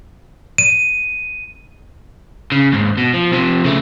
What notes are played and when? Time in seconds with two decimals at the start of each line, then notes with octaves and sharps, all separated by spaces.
0.58 D#7
2.52 C#3
2.72 D#2 G#2
2.97 B2
3.14 F3
3.33 C3 F3
3.65 C#3 A3